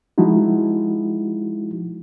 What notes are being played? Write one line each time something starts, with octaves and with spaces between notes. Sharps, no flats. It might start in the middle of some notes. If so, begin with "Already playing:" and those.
F3 G#3 D#4 E4 F#4